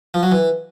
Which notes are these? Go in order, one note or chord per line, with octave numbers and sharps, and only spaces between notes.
F3
F#3
E3